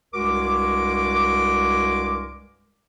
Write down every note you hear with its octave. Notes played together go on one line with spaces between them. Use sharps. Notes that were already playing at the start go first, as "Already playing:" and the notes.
C2 G2 G#3 F#4 A#4 D6